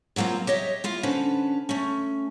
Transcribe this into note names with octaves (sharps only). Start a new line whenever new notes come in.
E3 F#3 A#3 C4 F4
G4 C#5 D#5 E5
E4 F4 F5
D3 C#4 B4 C5
A3 C#4